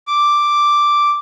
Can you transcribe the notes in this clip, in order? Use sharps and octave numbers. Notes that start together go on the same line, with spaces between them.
D6